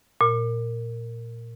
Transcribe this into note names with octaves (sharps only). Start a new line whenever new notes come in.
A#2